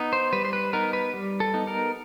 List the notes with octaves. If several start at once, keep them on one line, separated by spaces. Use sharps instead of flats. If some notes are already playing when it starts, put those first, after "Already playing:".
Already playing: B3 D#4
C5
G3 B4
C5
B4
B3 D#4 A#4
B4
G3
A4
B3 D#4
A#4